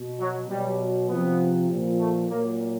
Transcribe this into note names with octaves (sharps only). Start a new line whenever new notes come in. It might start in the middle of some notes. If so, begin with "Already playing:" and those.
Already playing: B2
F#3
B2 F#3 G3
C3 F3 B3
A#2 F3
A3
A#2 F#3 A#3